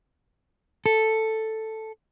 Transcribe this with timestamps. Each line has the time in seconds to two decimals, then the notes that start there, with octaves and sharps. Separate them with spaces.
0.86 A4